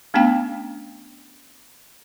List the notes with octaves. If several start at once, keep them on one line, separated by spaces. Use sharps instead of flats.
A3 B3 C#4 D4 F5 G5